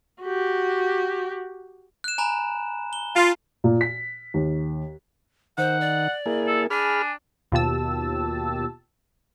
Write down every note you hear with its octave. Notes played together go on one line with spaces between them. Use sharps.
F#4 G4
F#6 E7
G#5 A#5 B5
G7
F4
A#2
B6
D#2
D#3 C5 F#5
D5
A#3 E4 G#4
A4
D4 G#4 G#5 B5 F6
D#2 B2 F4 G4 A5 E6